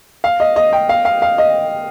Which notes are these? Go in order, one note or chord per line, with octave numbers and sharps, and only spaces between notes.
F5
D#5
D#5
G5
F5
F5
F5
D#5